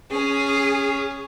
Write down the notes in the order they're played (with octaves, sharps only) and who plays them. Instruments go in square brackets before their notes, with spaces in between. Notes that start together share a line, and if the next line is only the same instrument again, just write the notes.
[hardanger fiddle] C#4 [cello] G#4